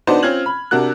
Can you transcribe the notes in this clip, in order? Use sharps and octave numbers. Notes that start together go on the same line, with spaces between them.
B3 D4 D#4 F#4 C5 D5
C4 C#4 F4 F6 G#6 F#7
B5
C3 D4 F#4 A#4 F#6